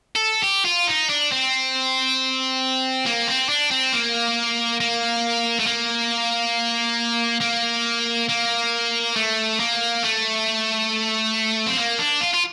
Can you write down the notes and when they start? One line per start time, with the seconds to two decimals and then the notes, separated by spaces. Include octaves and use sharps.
0.16 A4
0.44 G4
0.66 F4
0.88 D#4
1.10 D4
1.32 C4
3.06 A#3
3.28 C4
3.49 D4
3.71 C4
3.93 A#3
4.81 A#3
5.60 A3
5.67 A#3
7.41 A#3
8.29 A#3
9.16 A3
9.60 A#3
10.04 A3
11.67 C4
11.77 A#3
11.99 D4
12.20 F4
12.34 F4